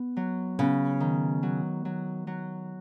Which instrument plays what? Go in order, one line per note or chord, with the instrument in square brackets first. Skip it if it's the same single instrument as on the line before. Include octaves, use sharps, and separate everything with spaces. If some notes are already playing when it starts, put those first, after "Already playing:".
Already playing: [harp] B3
F#3
[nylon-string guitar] C#3 [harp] B3
[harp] D#3
F#3
F#3
F#3